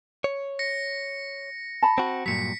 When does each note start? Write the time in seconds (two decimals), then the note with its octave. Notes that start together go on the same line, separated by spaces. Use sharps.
0.24 C#5
0.59 A#6 C#7
1.82 A5 B5
1.98 C4 F#4
2.26 G2 A#2 F#3 B6 C#7